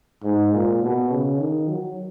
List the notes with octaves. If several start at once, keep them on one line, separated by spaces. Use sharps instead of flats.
G#2
A#2
B2
C#3
D#3
F#3